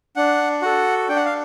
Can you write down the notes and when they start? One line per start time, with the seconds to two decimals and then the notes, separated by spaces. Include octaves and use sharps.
0.16 D4 F#5
0.62 F#4 A4 F#5
1.09 D4 G5
1.16 F#5
1.25 F5